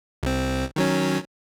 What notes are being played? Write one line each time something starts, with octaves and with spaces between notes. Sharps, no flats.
C2 C4
D#3 F#3 C#4